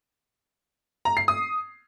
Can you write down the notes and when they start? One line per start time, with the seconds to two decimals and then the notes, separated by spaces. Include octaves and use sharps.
1.05 A#5
1.17 C7
1.28 D#6